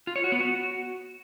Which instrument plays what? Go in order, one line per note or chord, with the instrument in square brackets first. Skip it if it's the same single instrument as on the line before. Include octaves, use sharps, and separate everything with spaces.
[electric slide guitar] F4
C#5
F#4
B3
F#4